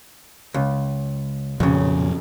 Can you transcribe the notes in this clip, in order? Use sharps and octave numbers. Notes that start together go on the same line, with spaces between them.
C#2
B1 F2 A#2 C#3 F3